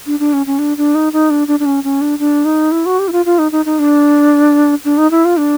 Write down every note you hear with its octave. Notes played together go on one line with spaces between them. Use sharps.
D4
D4
C#4
C#4
D4
D4
D#4
D#4
D4
D4
D4
C#4
C#4
D4
D4
D#4
E4
F#4
G4
E4
F4
F4
D#4
D#4
D#4
D4
D4
D#4
E4
F4
D4